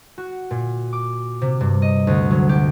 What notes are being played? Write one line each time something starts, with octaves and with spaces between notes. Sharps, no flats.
F#4
A#2
D6
C3
G2
D#5
D2
F#3
G4